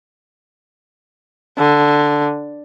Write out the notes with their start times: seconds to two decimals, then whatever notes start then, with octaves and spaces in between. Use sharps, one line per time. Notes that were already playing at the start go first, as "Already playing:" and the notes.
1.58 D3